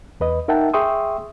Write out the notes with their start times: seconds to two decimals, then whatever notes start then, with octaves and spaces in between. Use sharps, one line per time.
0.20 E2 B4 D#5
0.48 D#4 A#4 E5 F#5 G5 A5
0.74 G#4 E5 G5 C6 C#6 D#6